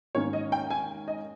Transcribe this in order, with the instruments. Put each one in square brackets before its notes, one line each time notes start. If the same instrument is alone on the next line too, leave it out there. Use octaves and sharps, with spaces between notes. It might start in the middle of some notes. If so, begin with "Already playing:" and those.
[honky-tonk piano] G#2 D#3 A#3 C#4 C#5
D#5
G5
G#5
D#5